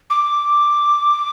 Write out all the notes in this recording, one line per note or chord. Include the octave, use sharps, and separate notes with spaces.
D6